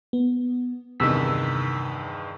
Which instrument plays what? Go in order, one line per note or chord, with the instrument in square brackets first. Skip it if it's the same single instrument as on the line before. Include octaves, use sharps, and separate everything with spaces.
[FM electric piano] B3
[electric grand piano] E2 G2 D#3 [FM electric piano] C3 E6 B6